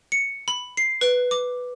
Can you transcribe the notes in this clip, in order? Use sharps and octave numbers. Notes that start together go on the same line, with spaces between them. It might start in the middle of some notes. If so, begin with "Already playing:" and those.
C#7
B5
C7
B4
D6